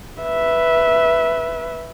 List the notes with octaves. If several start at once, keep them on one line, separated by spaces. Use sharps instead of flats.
B4 E5